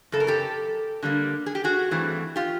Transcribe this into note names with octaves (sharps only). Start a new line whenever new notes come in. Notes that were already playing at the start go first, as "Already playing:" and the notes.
F#2 C#3 A4
A#4
G4 A4
D3 G3 A#3
G#4
G4
F#4 G#4
G2 E3 A3 C4
F4 G4